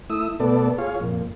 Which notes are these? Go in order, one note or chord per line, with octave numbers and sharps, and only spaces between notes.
A3 E4 D#6 E6
B2 A3 B3 A4 D5
F4 G#4 C#5 F5
F2 A#2